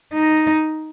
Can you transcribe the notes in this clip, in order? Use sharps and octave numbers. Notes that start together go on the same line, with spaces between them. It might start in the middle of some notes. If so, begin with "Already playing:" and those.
D#4